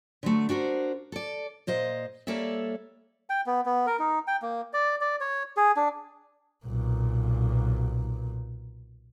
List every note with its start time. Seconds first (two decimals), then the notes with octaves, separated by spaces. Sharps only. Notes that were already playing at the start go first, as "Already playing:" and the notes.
0.23 D3 F#3 A3
0.49 D4 F#4 A#4 C5
1.12 A4 D5
1.67 A#2 C5 D#5 F5
2.27 G3 A#3 A4 C#5 D5 E5
3.30 G5
3.46 B3
3.66 B3
3.87 A#4
3.99 D#4
4.28 G5
4.42 A#3
4.73 D5
5.01 D5
5.20 C#5
5.57 G#4
5.77 D4
6.66 B1 A#2